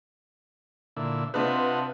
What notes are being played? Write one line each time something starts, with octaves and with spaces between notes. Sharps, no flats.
A#2 D3 E4
C3 D4 F4 B4 D#5 F#5